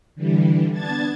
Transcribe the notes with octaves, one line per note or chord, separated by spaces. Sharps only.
D3 E3 G3
B3 D4 A5 G#6 A6